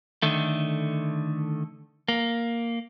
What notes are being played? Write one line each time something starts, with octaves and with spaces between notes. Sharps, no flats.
D3 D#3 A3
A#3